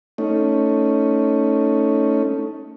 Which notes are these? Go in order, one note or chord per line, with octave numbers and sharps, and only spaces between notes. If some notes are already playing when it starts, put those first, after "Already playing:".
A3 C#4 D#4